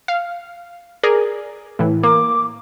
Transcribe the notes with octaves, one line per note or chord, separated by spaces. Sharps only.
F5
G#4 A#4 D5
A2 E3
A#3 D6